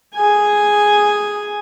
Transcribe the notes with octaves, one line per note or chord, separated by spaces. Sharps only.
G#4 G#5